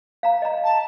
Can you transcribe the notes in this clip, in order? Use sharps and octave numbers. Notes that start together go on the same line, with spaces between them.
F5 A#5
D#5 A#5
A5